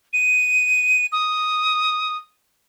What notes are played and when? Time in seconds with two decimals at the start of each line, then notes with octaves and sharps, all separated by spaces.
0.13 D#7
1.12 D#6